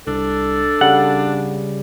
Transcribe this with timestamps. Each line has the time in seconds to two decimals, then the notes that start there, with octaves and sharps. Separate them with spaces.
0.07 C2 D4 A4
0.81 C#3 G3 F#5